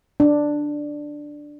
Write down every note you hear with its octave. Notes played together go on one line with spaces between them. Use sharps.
D4